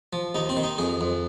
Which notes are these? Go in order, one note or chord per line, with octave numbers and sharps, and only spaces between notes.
F3
D#2 D#4
C4
D#3
D#4
F2 G#4
F2